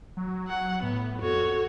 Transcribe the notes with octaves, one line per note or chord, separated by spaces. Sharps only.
F#3
F#5
A2 B3
F2 F#4 A4 C#5